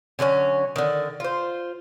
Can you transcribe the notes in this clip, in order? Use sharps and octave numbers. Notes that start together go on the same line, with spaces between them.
D3 F#3 C4 C#4
D3 D#3
F4 C5